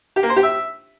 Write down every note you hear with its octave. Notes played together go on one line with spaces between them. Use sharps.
G4
A#3
C5
G4
E5